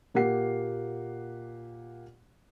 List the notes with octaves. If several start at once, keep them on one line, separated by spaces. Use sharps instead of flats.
A#2 A#3 G4 F#5 C7